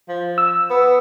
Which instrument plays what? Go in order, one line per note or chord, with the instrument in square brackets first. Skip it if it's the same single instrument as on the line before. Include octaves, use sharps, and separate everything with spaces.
[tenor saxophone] F3
[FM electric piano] E6
[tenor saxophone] B3